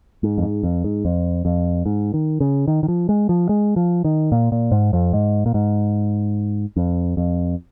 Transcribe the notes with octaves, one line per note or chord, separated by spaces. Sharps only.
G#2
F2
G#2
F2
G#2
F2
F2
G#2
D#3
C#3
D#3
D#3
F3
G#3
F3
G#3
F3
D#3
A#2
A#2
G#2
F2
G#2
A#2
G#2
F2
F2